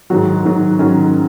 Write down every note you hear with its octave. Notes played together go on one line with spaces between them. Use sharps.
G#2 D#3 F#3 F#4
G#2 D#3 F#3
G#2 D#3 F#3 C#4